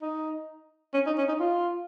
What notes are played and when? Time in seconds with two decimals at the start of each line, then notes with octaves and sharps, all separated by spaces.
0.02 D#4
0.94 C#4
1.06 D#4
1.18 C#4
1.28 D#4
1.40 F4